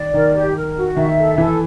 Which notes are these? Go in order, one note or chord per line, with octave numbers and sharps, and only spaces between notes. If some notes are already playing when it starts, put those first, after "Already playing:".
Already playing: D#3 D5
D#3 A#4
G4
A#4
F#4
D#3 E5
A4
E3 A4